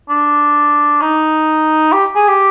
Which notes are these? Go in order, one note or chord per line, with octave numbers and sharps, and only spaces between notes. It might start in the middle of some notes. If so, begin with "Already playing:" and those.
D4
D#4
G4
G#4
G4